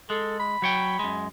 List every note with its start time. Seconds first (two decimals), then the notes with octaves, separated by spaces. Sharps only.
0.10 G#3 A4
0.40 B5
0.62 F#3 C#5 G5
0.99 F#2 G#3